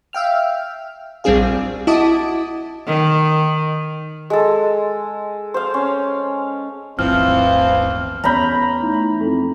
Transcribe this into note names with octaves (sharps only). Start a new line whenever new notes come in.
E5 F5 G5 F6
A#1 G3 C4 D4 G#4 F5
E4 F#4 D#5 A5 D6 D#6
D#3
G#3 A4
C5 F5
C#4
D1 G1 E3 F3 C4 F6
E2 C#4 A#5 B5 G6
A3 D#4 E4
F2